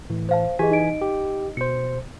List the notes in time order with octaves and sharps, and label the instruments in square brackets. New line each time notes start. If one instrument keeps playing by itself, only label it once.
[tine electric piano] A2 E3
[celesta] C5 F5 A5
[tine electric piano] E3 G#5 B6 [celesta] G4 G#4 D#5
[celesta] D#4 D#5 D7
[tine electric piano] G4
[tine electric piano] B2 C5 [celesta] C#7